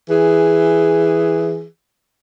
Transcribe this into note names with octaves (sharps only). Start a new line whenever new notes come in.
E3 G#4